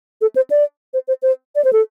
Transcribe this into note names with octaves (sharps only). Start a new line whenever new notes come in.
A4
C5
D5
C5
C5
C5
D5
C5
A4